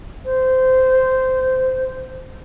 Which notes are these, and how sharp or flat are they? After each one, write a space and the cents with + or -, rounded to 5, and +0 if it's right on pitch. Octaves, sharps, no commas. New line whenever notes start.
C5 -15